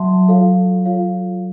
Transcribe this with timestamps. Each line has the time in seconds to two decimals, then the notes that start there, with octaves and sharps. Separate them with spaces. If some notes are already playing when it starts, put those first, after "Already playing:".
Already playing: F#3 E5 A5 C6
0.28 F4 A4 C#5 F5
0.85 F4 A4 C#5 F5